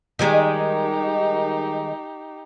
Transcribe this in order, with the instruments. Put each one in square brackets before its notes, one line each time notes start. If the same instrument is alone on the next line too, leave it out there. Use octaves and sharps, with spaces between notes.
[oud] D#3 G3 G#3 [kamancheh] D#4 G4